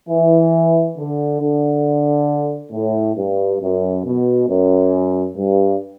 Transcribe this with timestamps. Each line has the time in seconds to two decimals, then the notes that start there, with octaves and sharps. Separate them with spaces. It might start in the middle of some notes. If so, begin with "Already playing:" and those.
0.08 E3
0.97 D3
1.40 D3
2.72 A2
3.17 G2
3.61 F#2
4.04 B2
4.48 F#2
5.36 G2